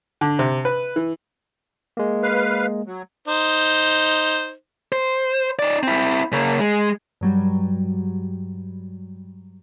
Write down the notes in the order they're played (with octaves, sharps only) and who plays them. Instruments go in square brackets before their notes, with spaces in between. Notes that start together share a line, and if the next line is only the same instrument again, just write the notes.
[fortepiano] D3
C3
B4
E3
[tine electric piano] G#3 A#3
[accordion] B4 F5
F#3
[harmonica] D#4 C5
[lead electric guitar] C5
D#4 D5
C4 E4
C#3 A#3
G#3
[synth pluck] G2 F#3 G3